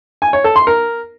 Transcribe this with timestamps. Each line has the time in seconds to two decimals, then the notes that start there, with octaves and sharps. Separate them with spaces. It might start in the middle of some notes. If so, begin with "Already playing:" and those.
0.22 G#5
0.33 C#5
0.44 A4
0.56 C6
0.67 A#4